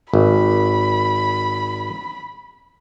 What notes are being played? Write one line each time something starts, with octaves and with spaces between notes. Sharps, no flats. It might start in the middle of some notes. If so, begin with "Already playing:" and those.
G#1 B5